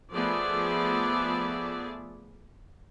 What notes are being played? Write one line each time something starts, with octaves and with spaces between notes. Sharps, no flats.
F3 A3 B3 G#4 D5 E5